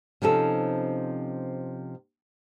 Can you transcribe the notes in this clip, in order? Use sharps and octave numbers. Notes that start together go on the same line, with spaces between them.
C3 F3 C#4 D#4 A4